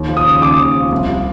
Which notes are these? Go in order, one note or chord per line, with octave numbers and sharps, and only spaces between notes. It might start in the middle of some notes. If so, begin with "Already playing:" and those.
Already playing: D#2
F3
D#6
C#3
D#2 D6
D#2
F3
C2
F3